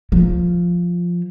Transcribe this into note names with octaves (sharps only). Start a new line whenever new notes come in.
F3